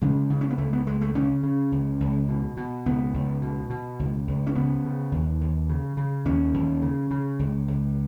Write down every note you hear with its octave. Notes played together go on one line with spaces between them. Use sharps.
C#3 G#3
C#3
C#4
B3
C#2 A3
B3
C#2 G#3
A3
C#3 C#4
C#3
C#2
C#2
B2
B2
C#2 B3
C#2
B2
B2
C#2
C#2
C#4
C#3 B3
C#3
D#2
D#2
C#3
C#3
D#2 C#4
D#2
C#3
C#3
C#2
C#2